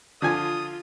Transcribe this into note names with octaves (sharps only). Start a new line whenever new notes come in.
D3 F3 F4 G#5 D#6